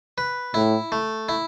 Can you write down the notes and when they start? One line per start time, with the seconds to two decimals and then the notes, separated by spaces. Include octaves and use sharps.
0.18 B4
0.54 A2 E4
0.92 A3
1.29 E4